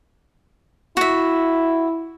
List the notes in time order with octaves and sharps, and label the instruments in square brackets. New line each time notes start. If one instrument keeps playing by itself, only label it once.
[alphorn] E4 [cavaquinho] F#4 E5